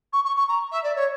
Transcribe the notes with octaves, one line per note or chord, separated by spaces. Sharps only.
C#6
C#6
C#6
A#5
E5
D5
C#5